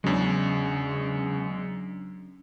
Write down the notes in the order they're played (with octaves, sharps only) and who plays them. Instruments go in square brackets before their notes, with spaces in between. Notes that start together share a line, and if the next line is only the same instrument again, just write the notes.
[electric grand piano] E2 G#3 [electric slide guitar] C#3 [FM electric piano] F#3 C#4 D4